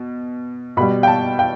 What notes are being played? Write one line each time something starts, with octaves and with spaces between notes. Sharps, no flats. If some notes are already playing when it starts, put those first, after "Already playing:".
Already playing: B2
B2 G3 B5
G5
A5
G5